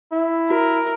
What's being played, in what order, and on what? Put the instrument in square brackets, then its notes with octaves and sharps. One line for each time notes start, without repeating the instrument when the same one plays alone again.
[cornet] E4
[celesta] F#4 [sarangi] A#4